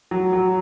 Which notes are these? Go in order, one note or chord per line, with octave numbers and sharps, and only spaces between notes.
F#3
F#3